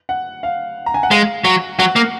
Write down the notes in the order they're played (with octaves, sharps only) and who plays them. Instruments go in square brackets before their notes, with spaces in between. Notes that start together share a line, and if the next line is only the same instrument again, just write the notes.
[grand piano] F#5
F5
A#5
G#5
F#5
[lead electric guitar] G#3 [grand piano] F5
[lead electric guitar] F#3 [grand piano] F#5
[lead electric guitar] F#3 [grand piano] F#5
[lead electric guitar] A#3